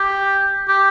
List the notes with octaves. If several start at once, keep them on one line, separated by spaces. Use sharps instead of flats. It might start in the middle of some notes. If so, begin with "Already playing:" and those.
Already playing: G4
G4